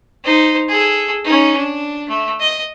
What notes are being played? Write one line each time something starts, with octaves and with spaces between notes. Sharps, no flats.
D#4 C5
G#4 A4
C#4 D#4
D4
A3
D#5